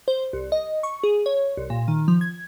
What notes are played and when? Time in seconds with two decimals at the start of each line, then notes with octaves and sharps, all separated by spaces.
0.08 C5
0.33 C2
0.52 D#5
0.83 C#6
1.03 G#4
1.26 C#5
1.57 C2
1.70 A#2
1.88 D#3
2.08 F3
2.21 G#6